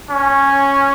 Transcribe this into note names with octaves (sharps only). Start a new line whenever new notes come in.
C#4